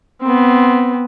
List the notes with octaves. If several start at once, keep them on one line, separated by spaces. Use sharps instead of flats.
B3 C4